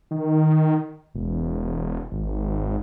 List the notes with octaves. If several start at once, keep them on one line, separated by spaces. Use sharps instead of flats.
D#3
E1
G#1